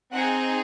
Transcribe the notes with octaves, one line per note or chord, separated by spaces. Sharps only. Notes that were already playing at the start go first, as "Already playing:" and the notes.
C4 D#4 G#4 F#5